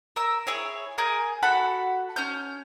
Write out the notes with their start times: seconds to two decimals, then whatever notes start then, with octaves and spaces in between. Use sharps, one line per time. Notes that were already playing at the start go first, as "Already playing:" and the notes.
0.16 A#4 E6
0.47 E4 G#4 C#5
0.98 G#4 A#4 G#5 G6
1.42 F#4 A4 F#5 B5
2.16 C#4 F6 G6